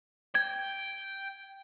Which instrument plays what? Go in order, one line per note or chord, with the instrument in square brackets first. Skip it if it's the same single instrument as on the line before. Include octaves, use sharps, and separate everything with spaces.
[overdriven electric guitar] G5 [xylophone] G#6